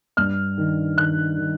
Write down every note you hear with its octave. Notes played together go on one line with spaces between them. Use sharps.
G2 F6
D#3
D#3 F#6
D#3